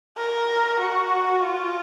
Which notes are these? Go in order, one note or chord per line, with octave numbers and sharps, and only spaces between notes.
A#4
F#4
F4